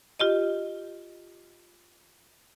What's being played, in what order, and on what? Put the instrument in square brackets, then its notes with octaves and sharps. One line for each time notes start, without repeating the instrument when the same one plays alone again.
[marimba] F4 G4 D#5